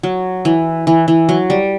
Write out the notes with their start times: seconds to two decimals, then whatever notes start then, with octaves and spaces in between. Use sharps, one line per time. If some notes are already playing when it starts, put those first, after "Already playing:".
0.03 F#3
0.45 E3
0.87 E3
1.08 E3
1.29 F#3
1.50 G3